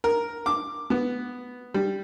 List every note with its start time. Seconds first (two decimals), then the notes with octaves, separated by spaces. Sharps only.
0.04 A#4
0.46 D6
0.90 B3
1.74 G3